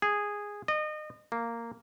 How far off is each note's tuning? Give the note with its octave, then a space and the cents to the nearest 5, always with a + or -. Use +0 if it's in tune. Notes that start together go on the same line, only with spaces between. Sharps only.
G#4 -10
D#5 -30
A#3 -10